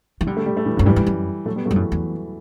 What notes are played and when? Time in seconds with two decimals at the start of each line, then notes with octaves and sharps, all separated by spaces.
0.21 E3
0.27 D3 G3
0.37 A3
0.46 G3
0.57 A3
0.66 E3 G3
0.77 F#2 F#3
0.86 G2 E3 G3
0.96 G2
1.07 F#2
1.46 F#3 A3
1.56 G3 B3
1.66 F#3 A3
1.71 G2
1.76 F#2 E3
1.92 E2